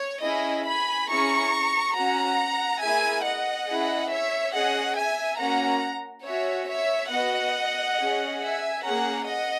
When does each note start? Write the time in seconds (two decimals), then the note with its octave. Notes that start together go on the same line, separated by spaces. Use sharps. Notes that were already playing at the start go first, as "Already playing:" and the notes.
Already playing: C#5
0.23 C#4 E4 G#4 D#5
0.66 G#5 B5
1.09 C#4 E4 G#4 A#5 C#6
1.96 C#4 F#4 F#5 A#5
2.82 A#3 E4 G#4 E5 G#5
3.25 D#5 F#5
3.68 C#4 E4 G#4
4.11 C#5 E5
4.53 C#4 G#4 D#5 F#5
4.97 E5 G#5
5.40 A#3 C#4 F#4 F#5 A#5
6.26 C#4 F#4 C#5 E5
6.69 C#5 E5
7.12 B3 F#4 D#5 F#5
7.98 C#4 G#4
8.41 E5 G#5
8.84 A#3 C#4 G#4 F#5 A#5
9.28 D#5 F#5